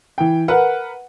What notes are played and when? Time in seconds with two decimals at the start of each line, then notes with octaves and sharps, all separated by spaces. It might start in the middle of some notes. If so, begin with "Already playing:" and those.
0.18 E3 G5
0.48 A#4 B4 F#5